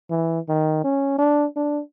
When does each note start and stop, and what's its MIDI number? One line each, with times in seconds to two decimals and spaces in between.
0.10 0.40 52
0.49 0.81 51
0.84 1.18 61
1.19 1.46 62
1.56 1.81 62